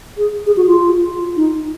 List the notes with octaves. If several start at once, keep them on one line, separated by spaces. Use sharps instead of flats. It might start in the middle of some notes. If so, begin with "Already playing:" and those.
G#4
G#4
F#4
F4
D#4